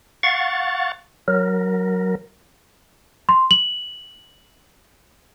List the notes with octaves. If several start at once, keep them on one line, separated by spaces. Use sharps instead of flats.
F5 F#5 C#6 A6
F#3 A#4
C6
F#7